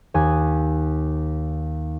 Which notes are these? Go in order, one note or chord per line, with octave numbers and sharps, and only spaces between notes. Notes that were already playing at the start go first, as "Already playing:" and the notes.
D#2 G#5 D#6 F#6